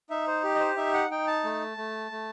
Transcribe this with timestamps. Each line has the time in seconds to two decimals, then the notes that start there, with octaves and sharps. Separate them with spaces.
0.10 D#4 E5
0.27 C5
0.43 G4
0.55 D#5
0.60 C5
0.76 D#4 E5
0.94 F#5
1.11 D#4 G5
1.27 A5
1.44 A3
1.77 A3
2.11 A3